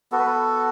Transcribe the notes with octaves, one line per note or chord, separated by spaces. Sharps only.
B3 F#4 A4
B4
A4